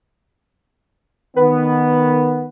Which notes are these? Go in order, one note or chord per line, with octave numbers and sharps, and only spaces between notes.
D#3 B3 B4